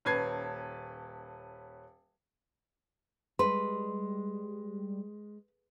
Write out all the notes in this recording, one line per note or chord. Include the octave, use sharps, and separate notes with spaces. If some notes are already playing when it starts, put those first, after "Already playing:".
D#1 C#4 B4 A5 G#6 C7
G3 G#3 B4 C6